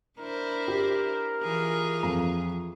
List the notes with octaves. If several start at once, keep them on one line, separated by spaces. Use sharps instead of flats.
D4 E4 A#4 C5
G4
E3 F4 G#4
F2 F3 A#5